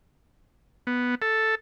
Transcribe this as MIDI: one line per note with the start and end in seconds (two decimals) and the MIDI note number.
0.87 1.15 59
1.22 1.55 69